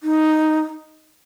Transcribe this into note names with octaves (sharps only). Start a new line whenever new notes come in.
D#4